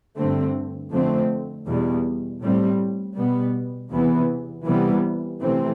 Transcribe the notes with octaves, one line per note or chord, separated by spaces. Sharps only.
G2 D3 A3 C4
F2 D3 A3 C4
E2 B2 G3
A2 G3 C4
B2 G3 B3
E2 C3 E3 B3
C3 E3 G3 B3
C3 E3 A3 C4